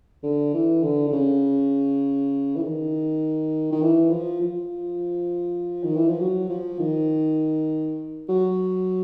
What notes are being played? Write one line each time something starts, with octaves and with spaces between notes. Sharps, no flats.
D3
E3
D3
D3
C#3
E3
D#3
D#3
E3
F3
F3
D#3
E3
F3
F#3
F3
D#3
F#3